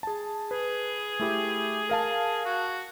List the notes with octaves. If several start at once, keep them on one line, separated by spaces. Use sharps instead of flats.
G#4 A5
G#4 B4
A3 E4 G4
A#4 F5 A5
F#4